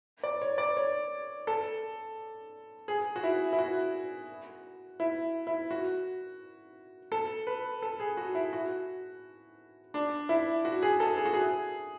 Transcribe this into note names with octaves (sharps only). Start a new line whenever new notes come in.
D5
C#5
D5
C#5
A4
G#4
F#4
E4
E4
F#4
E4
E4
F#4
A4
B4
A4
G#4
F#4
E4
F#4
D4
E4
F#4
G#4
A4
G#4
F#4
G#4